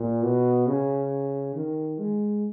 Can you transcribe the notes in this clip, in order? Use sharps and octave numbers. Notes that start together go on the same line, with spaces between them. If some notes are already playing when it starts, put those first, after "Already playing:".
Already playing: A#2
B2
C#3
D#3
G#3